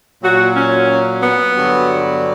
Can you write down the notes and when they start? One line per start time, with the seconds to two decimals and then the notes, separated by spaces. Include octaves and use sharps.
0.22 A#2 F#3 F#4
0.55 C#4
1.22 B3
1.55 G2 D3 F#3